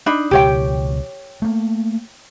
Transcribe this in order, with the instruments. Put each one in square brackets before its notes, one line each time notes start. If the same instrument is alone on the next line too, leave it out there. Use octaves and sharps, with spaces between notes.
[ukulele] D4 D#4 B5
[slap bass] C#2 B2 E3 [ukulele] G4 C#5 G5
[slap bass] A3 A#3